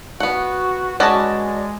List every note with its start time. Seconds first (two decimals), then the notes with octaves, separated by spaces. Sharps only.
0.20 B3 F#4 F#5
1.00 G#3 C#4 F#4 B4 D5 D#5 A5